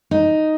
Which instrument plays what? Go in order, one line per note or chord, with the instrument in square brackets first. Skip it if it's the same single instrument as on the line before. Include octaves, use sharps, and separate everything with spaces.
[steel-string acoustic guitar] D#4